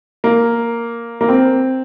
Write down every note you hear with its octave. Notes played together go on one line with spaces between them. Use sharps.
A#3
A#3
C4